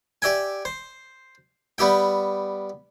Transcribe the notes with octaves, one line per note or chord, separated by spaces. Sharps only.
G4 D5 E5 G5 G#5
C5
G3 B3 G4 E5 G5